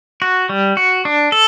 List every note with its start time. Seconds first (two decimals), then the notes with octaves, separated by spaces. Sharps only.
0.22 F#4
0.49 G3
0.77 F#4
1.05 D4
1.32 A4